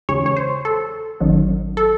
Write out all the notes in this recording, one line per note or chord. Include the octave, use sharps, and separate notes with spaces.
E2 C#3 G#3 C#4 C#5
C#5
C5
A4
G#1 F#2 D#3 F#3
A4